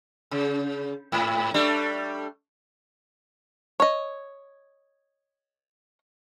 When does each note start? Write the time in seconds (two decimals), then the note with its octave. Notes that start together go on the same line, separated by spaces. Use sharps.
0.31 C#3
1.12 G#2
1.54 G3 A3 D4
3.80 C#5 D#5